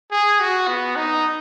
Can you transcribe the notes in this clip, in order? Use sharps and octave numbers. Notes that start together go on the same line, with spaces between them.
G#4
F#4
B3
D#4